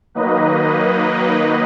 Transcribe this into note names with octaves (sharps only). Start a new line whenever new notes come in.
D#3 F#3 A#3 D#4 B4 D#5